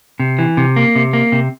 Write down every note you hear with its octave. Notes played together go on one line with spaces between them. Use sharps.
C3
E3
C3
A#3
C3
A#3
C3